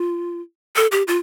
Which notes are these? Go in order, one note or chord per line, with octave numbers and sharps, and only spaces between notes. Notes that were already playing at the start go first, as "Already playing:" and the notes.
Already playing: F4
A4
G4
F4